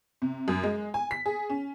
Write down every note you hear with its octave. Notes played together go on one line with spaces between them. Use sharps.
C3
F#2
G#3
G#5
B6
G#4
C#4